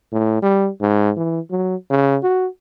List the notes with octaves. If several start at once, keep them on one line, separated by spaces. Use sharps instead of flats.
A2
G3
G#2
E3
F#3
C#3
F#4